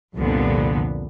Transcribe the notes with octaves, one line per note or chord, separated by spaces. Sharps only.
C2 F2 A#2 D3 B3